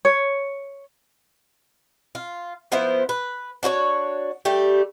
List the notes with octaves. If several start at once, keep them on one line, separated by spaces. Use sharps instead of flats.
C#5
F4
F3 B3 E4 C5
B4
D4 F#4 C5 C#5
G3 A3 G4